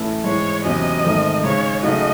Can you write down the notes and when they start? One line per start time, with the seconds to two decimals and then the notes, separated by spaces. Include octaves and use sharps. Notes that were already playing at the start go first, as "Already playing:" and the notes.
Already playing: A2 E3 A3 C#4 E4
0.24 G#2 E3 G#3 C#5
0.64 E2 C3 F#3 C#4 D#5
1.04 G#2 D#3 A3 C4
1.43 C#3 G#3 D#4 C#5
1.83 C#3 F#3 A3 D#4 F#4 D#5